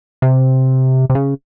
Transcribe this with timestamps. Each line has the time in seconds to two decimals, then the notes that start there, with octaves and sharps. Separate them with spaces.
0.22 C3
1.10 C3
1.15 C#3